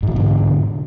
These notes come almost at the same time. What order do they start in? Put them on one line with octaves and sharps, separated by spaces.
G#2 E3 B2 D3